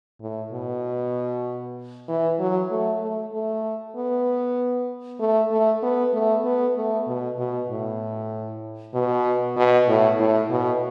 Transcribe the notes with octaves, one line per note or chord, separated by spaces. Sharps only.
A2
B2
E3
F#3
A3
A3
A3
B3
A3
A3
B3
A3
B3
A3
B2
B2
A2
B2
B2
A2
A2
B2